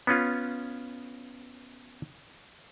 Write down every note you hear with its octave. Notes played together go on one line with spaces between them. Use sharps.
B3 C#4 F4